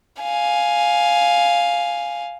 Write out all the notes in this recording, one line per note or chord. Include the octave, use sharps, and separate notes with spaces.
F5 G#5